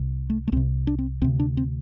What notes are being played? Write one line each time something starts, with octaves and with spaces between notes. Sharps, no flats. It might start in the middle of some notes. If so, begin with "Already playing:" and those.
Already playing: C2 C3
A3
A3
C2 C3 C4
D4
C4
D2 C3 C4
D4
C4